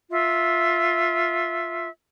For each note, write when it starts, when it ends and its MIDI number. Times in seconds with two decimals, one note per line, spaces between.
0.09 1.88 65
0.09 1.88 76